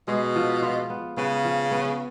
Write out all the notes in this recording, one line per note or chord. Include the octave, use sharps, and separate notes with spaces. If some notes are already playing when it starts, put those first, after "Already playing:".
B2 G#3
F3
F4
B3
C#3 B3
F3
B3